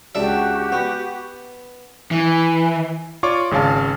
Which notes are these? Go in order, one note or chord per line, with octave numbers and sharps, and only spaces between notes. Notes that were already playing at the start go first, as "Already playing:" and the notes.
C#2 D4 F#4 G4 E5
B3
E3
F4 C#5 D5 C#6 D6
G#1 C#3 C#4 F5 A5